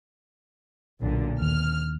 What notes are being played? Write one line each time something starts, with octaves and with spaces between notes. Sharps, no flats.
B1 A#2 D3
D#2 F6